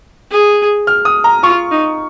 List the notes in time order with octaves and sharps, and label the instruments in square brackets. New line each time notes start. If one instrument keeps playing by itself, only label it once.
[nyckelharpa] G#4
[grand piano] F6
D#6
A#5
[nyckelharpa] F4 [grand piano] C#6
[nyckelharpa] D#4